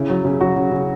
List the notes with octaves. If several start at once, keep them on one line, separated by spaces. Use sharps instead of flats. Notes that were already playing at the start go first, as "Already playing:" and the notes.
Already playing: C#3 E4
F#3
C#3
F#3 F#4
C#3
C#3